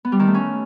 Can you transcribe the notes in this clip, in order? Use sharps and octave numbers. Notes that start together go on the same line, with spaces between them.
B3
G3
D#3
A3
C#4